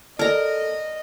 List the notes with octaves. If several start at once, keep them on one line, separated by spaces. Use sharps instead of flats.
A4 A#4 D5 D#5 A#5